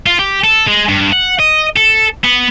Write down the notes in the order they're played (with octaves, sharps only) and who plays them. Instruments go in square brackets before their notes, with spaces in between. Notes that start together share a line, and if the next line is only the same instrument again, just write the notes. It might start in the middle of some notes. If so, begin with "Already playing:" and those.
[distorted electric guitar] F4
G4
A4
G#3
G2
F#5
D#5
A4
B3